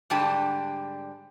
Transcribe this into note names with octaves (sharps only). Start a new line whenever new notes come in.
G#2 D3 G3 D4 G4 A5